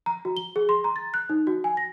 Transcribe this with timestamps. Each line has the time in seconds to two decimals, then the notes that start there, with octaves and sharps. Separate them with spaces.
0.06 A#5
0.25 F#4
0.37 G7
0.56 G#4
0.69 C6
0.84 A#5
0.96 A6
1.14 F#6
1.29 D#4
1.47 F#4
1.64 G#5
1.77 A#6